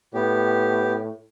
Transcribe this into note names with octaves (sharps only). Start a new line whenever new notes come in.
A2 B3 G4